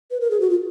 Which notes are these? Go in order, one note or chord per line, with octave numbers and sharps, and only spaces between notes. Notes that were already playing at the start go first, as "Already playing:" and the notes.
B4
A#4
G#4
F#4
F4